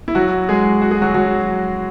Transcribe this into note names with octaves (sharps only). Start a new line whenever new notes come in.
E4
F#3 F#4
G#3 G#4
F#4
G#4
F#3 F#4
F#3 F#4